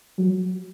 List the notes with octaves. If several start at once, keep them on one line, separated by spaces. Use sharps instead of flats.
F#3